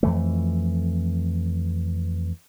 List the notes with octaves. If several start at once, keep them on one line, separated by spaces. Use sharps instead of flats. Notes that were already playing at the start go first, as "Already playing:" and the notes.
F2 E3 A3